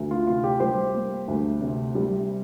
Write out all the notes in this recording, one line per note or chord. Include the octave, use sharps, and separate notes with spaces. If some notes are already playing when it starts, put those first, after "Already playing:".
Already playing: D2
F4
C3 F4
G4
G3 G4 C5
A#3
D2
C3
G3